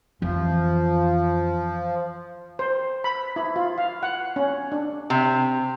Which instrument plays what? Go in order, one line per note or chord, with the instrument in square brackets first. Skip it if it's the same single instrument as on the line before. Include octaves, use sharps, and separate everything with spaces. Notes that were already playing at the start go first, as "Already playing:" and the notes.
[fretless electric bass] F2 [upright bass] E3 [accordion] F3
[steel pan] C5
B5
E4
F4
F5
F#5
C#4
D4
[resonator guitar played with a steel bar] C3